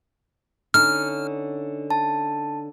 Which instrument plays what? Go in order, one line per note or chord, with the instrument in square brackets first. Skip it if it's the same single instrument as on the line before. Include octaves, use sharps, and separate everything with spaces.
[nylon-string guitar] D3 C#4 D#4 [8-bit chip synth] F6
[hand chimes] A5